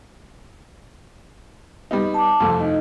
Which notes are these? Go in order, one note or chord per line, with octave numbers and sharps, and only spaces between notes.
G3 B3 D#4
A5 D6
C2 F2 A3
D#4 D#5